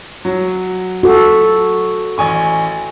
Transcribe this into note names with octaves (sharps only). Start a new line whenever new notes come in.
F#3
F#4 A4
A1 G#5 C#6